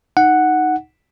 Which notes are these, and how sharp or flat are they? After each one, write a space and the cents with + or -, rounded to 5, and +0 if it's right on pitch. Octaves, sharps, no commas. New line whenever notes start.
D#4 +0 F#5 +0